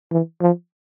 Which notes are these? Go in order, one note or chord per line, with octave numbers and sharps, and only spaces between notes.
E3
F3